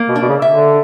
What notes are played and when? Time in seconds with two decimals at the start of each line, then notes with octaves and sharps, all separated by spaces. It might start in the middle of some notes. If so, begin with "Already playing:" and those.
Already playing: A#3
0.09 B2
0.16 D4
0.22 B2
0.29 C#3
0.42 E5
0.49 D3